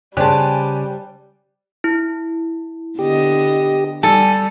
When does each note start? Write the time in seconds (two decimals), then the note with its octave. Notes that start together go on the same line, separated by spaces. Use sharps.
0.17 C#3 G3 G4 C5 D5 G#5 A5 F#6
1.84 E4
2.99 D3 B3 G4 D#5
4.03 G3 A4 G#5